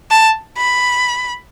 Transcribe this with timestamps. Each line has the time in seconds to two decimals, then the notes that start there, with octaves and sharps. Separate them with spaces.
0.11 A5
0.58 B5